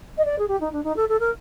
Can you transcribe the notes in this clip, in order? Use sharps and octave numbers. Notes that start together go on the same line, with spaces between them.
D#5
D5
G#4
G4
D#4
D4
D#4
A4
A4
A#4